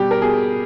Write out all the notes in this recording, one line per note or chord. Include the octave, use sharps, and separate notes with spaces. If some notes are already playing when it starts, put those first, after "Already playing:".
Already playing: B2 G3 G4
A#4
B2 G#4